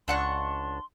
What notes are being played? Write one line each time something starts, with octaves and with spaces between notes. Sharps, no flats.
C#2 D4 F#5 C6 C#6